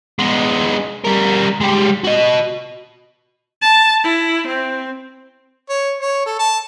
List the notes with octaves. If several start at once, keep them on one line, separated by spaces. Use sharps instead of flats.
G#3 B3
G3 A#4
G#3 G4
F#4 D#5
A5
E4
C4
C#5
C#5
A4
A5